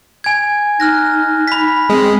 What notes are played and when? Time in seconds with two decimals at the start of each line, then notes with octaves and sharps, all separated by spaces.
0.24 G#5 G#6
0.80 D#4 F6 F#6 A#6
1.48 B5 B6
1.89 G#3 C4